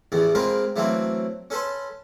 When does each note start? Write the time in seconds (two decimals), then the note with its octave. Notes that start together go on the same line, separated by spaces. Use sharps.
0.12 A1 E2 E3 B3
0.35 G#3 A#3 C4 F4 A#4 B4
0.76 E3 F#3 A3 A#3 C4
1.50 C#4 A4 B4 A5 C6